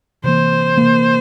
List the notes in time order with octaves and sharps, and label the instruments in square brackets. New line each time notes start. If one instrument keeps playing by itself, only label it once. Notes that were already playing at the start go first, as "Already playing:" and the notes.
[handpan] C3 E3 A#3 [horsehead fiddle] C5
[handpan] C3 E3 A#3